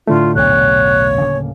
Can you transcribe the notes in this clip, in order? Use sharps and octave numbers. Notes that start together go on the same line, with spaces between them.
A2 D3 A3 F4
B1 E2 A#2 C#5 F#6
D1 C#3 A#3